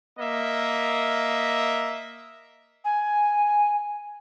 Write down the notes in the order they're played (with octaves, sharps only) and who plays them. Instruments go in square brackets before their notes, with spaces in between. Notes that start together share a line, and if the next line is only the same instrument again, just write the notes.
[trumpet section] A#3 D#5 E5
[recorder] G#5